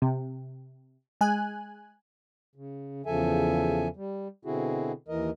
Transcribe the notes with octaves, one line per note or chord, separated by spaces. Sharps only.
C3
G#3 G#5 F#6
C#3
E2 C#3 F3 A4 E5 G#5
G3
B2 D3 C4 E4 F#4 G#4
D#2 E3 A#4 D#5